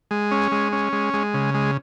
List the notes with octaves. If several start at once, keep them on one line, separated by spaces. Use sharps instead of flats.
G#3
C#4
G#3
C#4
G#3
G#3
C#3
G#3